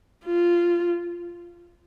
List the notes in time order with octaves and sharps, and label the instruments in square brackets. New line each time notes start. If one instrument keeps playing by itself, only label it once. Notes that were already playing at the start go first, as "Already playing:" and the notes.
[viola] F4